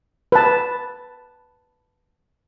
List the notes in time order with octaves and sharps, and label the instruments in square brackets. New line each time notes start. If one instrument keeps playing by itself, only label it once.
[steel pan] B4 A5